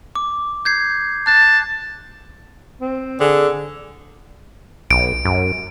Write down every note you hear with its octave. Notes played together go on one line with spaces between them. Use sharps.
D6
G6 G#6 C7
A5 F#6
C4
D3 G#4
B1 D7
F#2